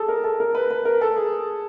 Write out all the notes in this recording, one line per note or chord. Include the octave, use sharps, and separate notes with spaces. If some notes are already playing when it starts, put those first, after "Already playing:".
Already playing: G#4 A4
A#4
A4
A#4
B4
B4
A#4
A4
G#4